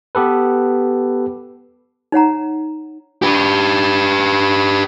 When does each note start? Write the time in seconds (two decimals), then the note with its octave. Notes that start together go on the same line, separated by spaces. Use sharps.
0.15 B3 G4 A4 B4
2.12 D#4 C#5 F#5 A#5
3.22 G4 B4